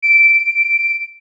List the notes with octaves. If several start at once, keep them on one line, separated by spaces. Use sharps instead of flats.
D7